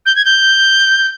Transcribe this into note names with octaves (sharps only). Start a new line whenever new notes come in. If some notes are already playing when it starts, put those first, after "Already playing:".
G6
G#6
G6